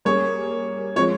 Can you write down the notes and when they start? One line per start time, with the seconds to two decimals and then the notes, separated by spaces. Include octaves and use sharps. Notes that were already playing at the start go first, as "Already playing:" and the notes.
0.05 G3 A#3 C#4 G#4 C#5
0.96 F3 G#3 C4 F4 C#5